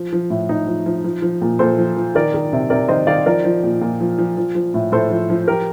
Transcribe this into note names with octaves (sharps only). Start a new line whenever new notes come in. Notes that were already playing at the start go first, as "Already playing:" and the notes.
Already playing: F3
F3
A2
A2 D#4
F3
F3
F3
F3
A#2
A#2 A4 C5
F3
F3
D#3 A#4 D5
D#3
C3
C3 A#4 D5
D#3 C5 D#5
D#3 D5 F5
F3 A#4 D5
F3
A#2
A#2
F3
F3
F3
F3
A2
A2 A4 C5
F3
F3
F3 G4 A#4